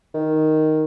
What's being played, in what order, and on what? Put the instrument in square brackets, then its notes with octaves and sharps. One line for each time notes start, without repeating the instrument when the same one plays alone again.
[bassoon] D#3